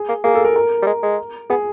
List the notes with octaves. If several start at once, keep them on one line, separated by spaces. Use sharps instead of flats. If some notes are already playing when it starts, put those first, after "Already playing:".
Already playing: G#4
A#3
A#3 G#4
A4
A#4
A#4
G3
G#3
G#3
B3 G#4